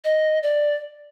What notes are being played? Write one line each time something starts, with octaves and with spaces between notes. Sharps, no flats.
D#5
D5